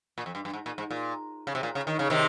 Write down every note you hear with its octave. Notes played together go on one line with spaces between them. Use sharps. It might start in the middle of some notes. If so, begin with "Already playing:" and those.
A#2
F2
G2
G2
G#2
A#2
G#2
A#2
C#3
C3
A#2
C#3
D#3
C#3
C3 D#3